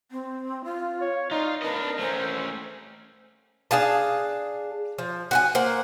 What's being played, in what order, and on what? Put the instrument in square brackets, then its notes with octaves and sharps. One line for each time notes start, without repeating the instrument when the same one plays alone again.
[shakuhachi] C4
F4
[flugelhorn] C#5
[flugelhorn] D#4 [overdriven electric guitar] F4 [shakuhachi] D5
[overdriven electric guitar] D4 D#5 [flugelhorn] A#4 [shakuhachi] B4
[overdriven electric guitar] A3 C#4 [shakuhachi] C5
[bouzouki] D4 G#4 F5 A5
F3
F#4 F#5 G#5
A#3 C5 F#5